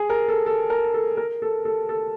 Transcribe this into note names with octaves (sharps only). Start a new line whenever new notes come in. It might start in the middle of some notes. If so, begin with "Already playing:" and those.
Already playing: G#4
A#4
A4
A4
A#4
A4
A#4
A4
A4
A4